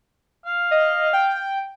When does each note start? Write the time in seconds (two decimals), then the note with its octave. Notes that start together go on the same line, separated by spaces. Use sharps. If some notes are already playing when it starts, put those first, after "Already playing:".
0.45 F5
0.71 D#5
1.13 G5